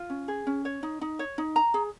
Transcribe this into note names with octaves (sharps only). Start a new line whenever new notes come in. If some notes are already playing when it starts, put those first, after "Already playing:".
Already playing: F4
C#4
G#4
C#4
C#5
D#4
D#4
C#5
D#4
A#5
G#4